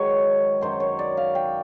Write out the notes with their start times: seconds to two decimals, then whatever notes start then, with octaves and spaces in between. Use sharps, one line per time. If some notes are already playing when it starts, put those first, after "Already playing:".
Already playing: G#2 D#3 F#3 B4 C#5
0.61 F#2 D#3 F#3 C5
0.80 C#5
0.99 D5
1.17 F5
1.35 G5